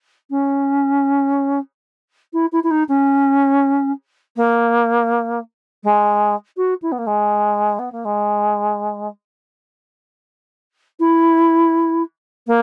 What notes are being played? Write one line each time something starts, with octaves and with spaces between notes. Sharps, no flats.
C#4
E4
E4
E4
D#4
C#4
A#3
G#3
F#4
E4
B3
A#3
G#3
B3
A#3
G#3
E4
A#3